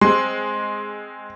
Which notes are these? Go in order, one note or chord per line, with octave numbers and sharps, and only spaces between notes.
G#3 C4 C6